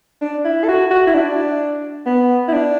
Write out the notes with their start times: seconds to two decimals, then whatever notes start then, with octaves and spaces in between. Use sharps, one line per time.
0.21 D4
0.45 E4
0.64 A4
0.68 F#4
0.91 F#4
1.07 E4
1.14 D4
2.06 B3
2.48 E4
2.53 D4